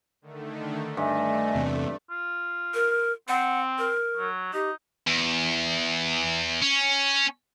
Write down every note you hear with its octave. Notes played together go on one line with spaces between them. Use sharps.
D3 D#3 A3
G2 A3 D#5 E5 G#5
E2 C3
F4
A#4
C4 F#5
A#4
F#3
D#4 G4
E2
C#4